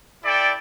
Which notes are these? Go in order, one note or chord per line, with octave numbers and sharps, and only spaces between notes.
E4 A4 D5 G5